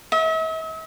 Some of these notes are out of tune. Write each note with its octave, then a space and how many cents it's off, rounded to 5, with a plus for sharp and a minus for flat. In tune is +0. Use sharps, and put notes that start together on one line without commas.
E5 -45